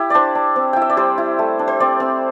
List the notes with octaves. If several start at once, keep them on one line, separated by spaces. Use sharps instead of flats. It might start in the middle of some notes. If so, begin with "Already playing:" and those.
Already playing: E4 G4
D4 C5 D5
D4
C4
E4 G5
E5
D5
G3 C5
E4
A3
D4
C5
C4 D5
C4